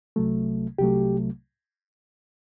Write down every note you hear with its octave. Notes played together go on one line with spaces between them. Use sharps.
C2 C3 F#3 A3
C2 C3 F#3 A3 G4